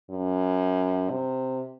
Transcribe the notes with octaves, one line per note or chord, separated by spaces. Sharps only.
F#2
C3